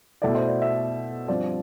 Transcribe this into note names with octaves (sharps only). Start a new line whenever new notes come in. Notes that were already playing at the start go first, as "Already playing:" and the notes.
B2 A3 E4 D5
C5
D5
E5
G2 F3 C4 D5